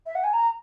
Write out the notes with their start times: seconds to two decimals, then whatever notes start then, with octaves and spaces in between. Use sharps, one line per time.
0.06 E5
0.15 F#5
0.24 G#5
0.33 A#5